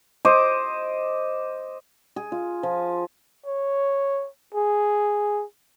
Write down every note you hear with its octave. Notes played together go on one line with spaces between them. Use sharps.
C5 D#5 D6
G#4
F4
F3
C#5
G#4